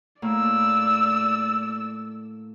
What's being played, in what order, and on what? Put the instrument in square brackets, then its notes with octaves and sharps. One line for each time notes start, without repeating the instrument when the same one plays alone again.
[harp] A2 A#3 [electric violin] D5 E6